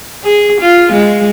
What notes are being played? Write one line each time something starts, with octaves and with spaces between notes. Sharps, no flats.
G#4
F4
G#3